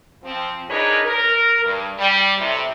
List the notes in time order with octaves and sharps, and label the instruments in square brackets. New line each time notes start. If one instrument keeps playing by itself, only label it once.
[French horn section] F3 C4
D4 D#4 G#4 A#4 B4 C#5
A#4
G2
G3
A2 C3